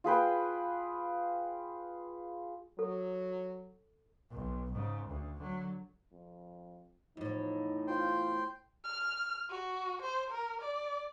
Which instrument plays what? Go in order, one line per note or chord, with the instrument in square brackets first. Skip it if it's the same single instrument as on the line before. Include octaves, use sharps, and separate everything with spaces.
[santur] F4 G#4 B4 G5
[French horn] F#3 [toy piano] A4
[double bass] B1
G#2 C#3
D2
D3 F#3
[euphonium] F2
[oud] E2 A2 [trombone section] F3 [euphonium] D#4
[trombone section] F4 [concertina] C5 G5
[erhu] F6
F#4
C5
A#4
D5